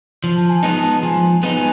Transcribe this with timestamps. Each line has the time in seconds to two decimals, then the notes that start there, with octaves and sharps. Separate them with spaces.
0.24 F3
0.36 A5
0.50 G#5
0.63 G#3 B3 D#4 A5
1.03 F3 G#5
1.43 G#3 B3 D#4
1.55 G#5